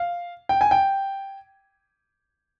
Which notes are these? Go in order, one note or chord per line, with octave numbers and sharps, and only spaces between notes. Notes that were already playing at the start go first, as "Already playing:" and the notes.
Already playing: F5
G5
G#5
G5